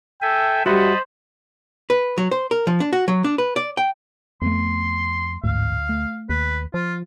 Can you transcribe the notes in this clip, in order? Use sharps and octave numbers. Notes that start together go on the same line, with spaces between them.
A4 E5 G5 G#5
G3 F#4 C5 D#5 E5 F#5 A5 B5
B4
F#3
C5
A#4
F3
D4
F#4
F#3
D4
B4
D5
G5
F2 A3 B3 C6
A1 D2 G#2 F5
A3
D#2 B4
F3 F4